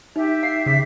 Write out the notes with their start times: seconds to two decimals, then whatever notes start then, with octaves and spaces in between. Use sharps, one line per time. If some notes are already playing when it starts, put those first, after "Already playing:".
0.16 D#4 G4 E5
0.43 F5 C7
0.66 C#3 B6